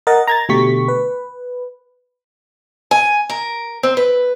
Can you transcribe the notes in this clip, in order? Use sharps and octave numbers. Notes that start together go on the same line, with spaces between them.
A#4 D#5 F#5 A6
A#5 G#6 A6
B2 D3 A3 G4 C#6 B6
B4
G#5
A#4
C4
B4